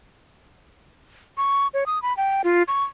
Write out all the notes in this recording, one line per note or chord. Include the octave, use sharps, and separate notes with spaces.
C#6
C#5
D#6
B5
G5
F4
C#6